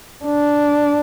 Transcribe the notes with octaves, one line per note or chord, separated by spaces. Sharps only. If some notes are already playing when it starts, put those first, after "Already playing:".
D4